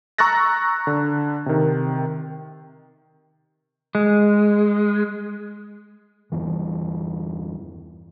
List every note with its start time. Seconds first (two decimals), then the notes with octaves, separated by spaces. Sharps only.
0.18 A#5 C#6 E6 F#6 A6 A#6
0.87 D3
1.46 C3 D#3
3.95 G#3
6.32 E2 G2 E3